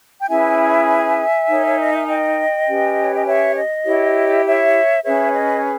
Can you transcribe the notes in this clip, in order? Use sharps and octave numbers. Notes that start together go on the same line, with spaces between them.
G5
C#4 E4 G#4 B4 E5 G#5
D#4 A#4 C#5
C#5
D#5
E5
D#5 G5
C#4 G4 B4
C#5
D#5
C#5 E5
D#5
E4 G4 C#5
C#5 E5
C#4 G#4 B4 C#5 E5
D#5